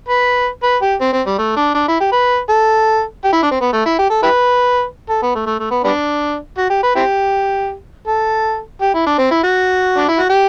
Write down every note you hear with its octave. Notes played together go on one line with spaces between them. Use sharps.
B4
B4
G4
C4
C4
G3
A3
D4
D4
E4
G4
B4
A4
G4
E4
D4
C4
B3
A3
E4
G4
A4
E4 G4 B4
A4
B3
A3
A3
A3
B3
G3 B3 D4
F#4
G4
B4
C4 E4 G4
A4
G4
E4
D4
C4
E4
F#4
D4
E4
F#4
G4